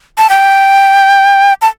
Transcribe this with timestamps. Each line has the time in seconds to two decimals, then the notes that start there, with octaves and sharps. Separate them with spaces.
0.18 A5
0.30 G5
1.62 A5